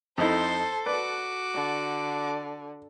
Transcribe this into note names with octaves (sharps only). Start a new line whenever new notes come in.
F2 D#4 E4 A4 C5 C6
F#4 B4 D5 D6
D3